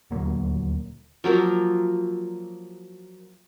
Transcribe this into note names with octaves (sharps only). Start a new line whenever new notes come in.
D#1 D2 F#3 A#3
F3 F#3 A#3 A#4